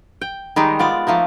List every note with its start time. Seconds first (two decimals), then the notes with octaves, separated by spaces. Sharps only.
0.21 G5
0.56 D#3 G3 G#3 D#4
0.79 B3 F4 D5
1.07 F3 A3 A#3 D#4